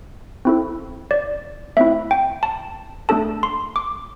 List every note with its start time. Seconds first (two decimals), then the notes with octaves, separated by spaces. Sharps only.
0.45 C4 E4 A4
1.11 D5
1.77 A3 C4 E4 E5
2.11 G5
2.43 A5
3.09 A3 D4 A4 A5
3.43 C6
3.76 D6